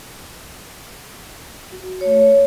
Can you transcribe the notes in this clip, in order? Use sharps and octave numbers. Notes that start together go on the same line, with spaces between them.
F#4
A3 C#5